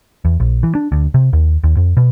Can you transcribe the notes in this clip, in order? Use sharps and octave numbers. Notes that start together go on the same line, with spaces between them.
E2
A#1
E3
D4
D2
C3
D#2
D#2
F2
B2